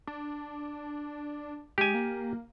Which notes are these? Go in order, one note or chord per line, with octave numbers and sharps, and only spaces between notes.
D4
G#3 G4 G#5
A#3